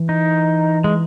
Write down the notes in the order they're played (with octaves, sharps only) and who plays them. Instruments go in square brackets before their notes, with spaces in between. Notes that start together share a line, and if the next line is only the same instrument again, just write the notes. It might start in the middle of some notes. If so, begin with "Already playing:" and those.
Already playing: [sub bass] E3
[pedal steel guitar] D#4
G#3